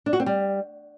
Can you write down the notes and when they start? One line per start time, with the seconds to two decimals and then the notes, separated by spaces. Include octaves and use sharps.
0.06 D4
0.13 F#4
0.20 C4
0.26 G3